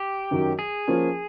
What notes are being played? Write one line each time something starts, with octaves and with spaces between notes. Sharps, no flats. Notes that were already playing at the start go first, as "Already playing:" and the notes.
Already playing: G4
F#2 D#3 F#3
G#4
F3 A#3 C#4